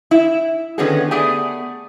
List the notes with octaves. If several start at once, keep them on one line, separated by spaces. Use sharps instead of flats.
E4
D3 D#3 B3 C#4 F#4 G#4
A3 B3 G4 G#4 D5 G#5